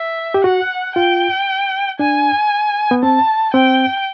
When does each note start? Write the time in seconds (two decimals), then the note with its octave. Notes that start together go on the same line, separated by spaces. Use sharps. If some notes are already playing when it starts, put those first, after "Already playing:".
Already playing: E5
0.34 G4
0.44 F#4 F#5
0.96 F4 G5
1.99 D4 G#5
2.91 B3
3.03 C4 A5
3.54 C4 G5